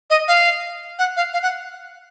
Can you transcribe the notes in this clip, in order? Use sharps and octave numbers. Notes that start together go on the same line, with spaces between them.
D#5
F5
F#5
F5
F5
F#5